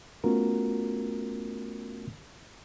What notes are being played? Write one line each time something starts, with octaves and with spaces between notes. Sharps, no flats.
A3 B3 C#4 F4 F#4 A#4